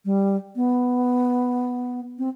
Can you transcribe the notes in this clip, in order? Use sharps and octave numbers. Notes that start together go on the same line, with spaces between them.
G3
B3
C4